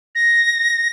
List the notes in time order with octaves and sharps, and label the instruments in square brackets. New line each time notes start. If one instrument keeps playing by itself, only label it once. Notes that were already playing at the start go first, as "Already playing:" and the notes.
[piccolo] A#6